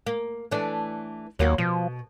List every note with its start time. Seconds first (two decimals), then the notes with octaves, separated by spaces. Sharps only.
0.06 A#3
0.51 E3 A3 D4
1.39 D#2 F#3 A#3 F#4
1.58 B2 F3